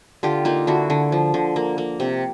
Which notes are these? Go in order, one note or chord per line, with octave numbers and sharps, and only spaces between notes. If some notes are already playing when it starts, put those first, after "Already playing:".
D3 F4 G4
A#3 D#4 F4
D3 E4 F#4
D3
F3
D3
A#3
A#3
C3